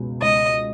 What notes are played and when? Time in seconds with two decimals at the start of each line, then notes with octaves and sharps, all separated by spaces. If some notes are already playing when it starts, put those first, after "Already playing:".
Already playing: C#2 B2 G#3
0.22 C#2 D#5